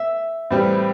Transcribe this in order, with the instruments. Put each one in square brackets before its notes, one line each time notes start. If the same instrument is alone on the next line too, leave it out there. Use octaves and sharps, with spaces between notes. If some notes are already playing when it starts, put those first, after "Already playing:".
Already playing: [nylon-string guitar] E5
[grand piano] A2 E3 G3 C4 G4